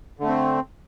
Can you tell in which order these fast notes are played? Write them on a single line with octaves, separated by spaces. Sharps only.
D3 A3 C4